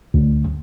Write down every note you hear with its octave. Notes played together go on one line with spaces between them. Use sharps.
D2